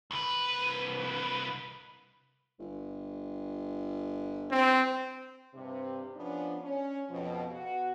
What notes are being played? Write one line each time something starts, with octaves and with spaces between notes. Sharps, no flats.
C2 B4
G1
C4
G2 C3
F3 B3 C#4 D4
C#4
F2 B2 F3
B2 F#4